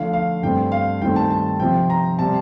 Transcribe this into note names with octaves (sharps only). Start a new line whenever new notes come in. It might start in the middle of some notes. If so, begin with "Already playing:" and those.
Already playing: D3 F3 A3 F5
F5
G2 D3 A3 C4 G5
F5
G2 D#3 A3 C4 G5
A5
A5
C3 F3 C4 G5
A#5
C3 G3 C4 A5